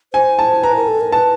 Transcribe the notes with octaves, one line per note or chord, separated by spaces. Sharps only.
C5 G#5
A5
B4 A#5
A#4
A4
A#4
B4 A5